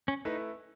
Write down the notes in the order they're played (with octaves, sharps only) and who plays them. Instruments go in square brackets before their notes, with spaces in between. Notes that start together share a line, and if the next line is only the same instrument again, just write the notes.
[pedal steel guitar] C#4
[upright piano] A3 E4 B4 [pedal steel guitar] D#4